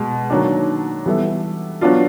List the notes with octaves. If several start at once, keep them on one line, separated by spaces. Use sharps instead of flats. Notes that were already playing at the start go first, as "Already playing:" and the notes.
Already playing: B2 G#3
D#3 F#3 A#3 D4
E3 G3 B3 E4 A4
F#3 B3 D4 F4